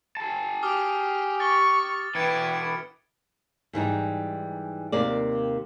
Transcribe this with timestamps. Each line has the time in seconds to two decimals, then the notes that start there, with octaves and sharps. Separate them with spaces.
0.17 G#4 A5
0.63 G4 D6 D#6 F6
1.40 C#6 A6 G7
2.15 B2 E3 E4 B4 G5 G#6 C#7 D7
3.73 G#2 E3 G3 D#4
4.92 D#2 C3 A#3 D5